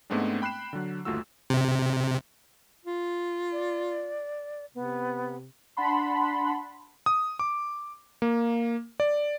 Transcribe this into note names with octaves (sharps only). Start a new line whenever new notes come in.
G#2 G#3 A3 B3 C4 D4
G5 B5 F#6 C7 E7
D3 F#3
G1 D#2 A3 F4 F#4 E6
C3
F4
D5
C3 B3
D4 F#5 A5 B5 C6
D#6
D6
A#3
D5